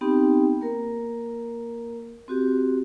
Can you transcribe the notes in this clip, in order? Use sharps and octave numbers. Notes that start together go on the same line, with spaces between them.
B3 C4 D#4 G4 G5
A#3 A#4
C4 F#4 G4